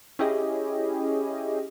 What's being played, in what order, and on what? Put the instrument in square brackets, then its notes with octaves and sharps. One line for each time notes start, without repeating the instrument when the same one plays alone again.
[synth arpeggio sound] C#4 E4 G4 G#4 D#5